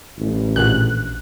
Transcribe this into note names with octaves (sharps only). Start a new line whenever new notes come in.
A1
A#1 F#6